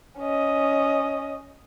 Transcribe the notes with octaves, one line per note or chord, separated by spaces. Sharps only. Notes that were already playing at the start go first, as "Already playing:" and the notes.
C#4 D#5